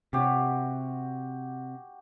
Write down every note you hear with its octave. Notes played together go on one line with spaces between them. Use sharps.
C3 F#4 G4